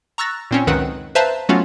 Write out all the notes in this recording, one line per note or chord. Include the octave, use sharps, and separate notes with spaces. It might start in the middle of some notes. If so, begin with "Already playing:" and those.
A#5 C#6 E6 F#6 A6 A#6
A#2 C4 C#4
C#2 F#2 D#3 C4 B4 F#5
B4 C5 E5 F5 A5 A#5
F#3 A3 B3 C#4 F4 F#4